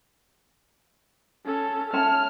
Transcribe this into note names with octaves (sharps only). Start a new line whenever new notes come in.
C#4 A4
C#4 E5 A5 F6